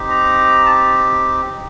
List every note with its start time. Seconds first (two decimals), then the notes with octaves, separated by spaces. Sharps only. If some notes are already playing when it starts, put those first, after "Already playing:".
Already playing: C4 D#4 G4
0.09 A#5
0.66 A5